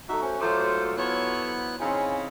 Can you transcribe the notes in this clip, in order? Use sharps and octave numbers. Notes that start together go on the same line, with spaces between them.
A3 D#4 F#4 E5
C#4 C5 C#6
G#2 F#3 A3 F4 C5 A#5 D6
B3 E4 A4 C5 C#5 F#6
C#3 C4 D#4 E4 G5 G#5